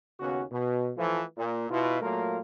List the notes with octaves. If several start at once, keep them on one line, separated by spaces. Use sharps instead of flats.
D#2 C#3 B3 C#4 F#4
B2
E3 F3 A3
A#2
B2 E4 F4
A#2 F#3 A3 A#3 F4 A#4